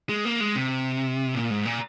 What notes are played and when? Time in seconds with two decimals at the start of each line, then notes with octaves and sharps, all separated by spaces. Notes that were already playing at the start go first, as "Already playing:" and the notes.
0.09 G#3
0.25 A#3
0.40 G#3
0.56 C3
1.34 A#2
1.50 G#2
1.66 A#2